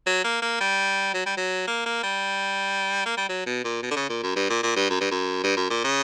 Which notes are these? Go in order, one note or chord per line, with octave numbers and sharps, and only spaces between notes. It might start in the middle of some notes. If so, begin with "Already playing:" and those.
F#3
A#3
A#3
G3
F#3
G3
F#3
A#3
A#3
G3
A#3
G3
F#3
B2
A#2
B2
D3
C#3
A#2
F#2
G2
A#2
A#2
G2
F#2
G2
F#2
G2
F#2
A#2
C#3